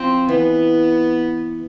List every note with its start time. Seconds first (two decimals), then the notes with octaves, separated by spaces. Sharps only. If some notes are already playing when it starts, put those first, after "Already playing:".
Already playing: F3 C4
0.28 E3 B3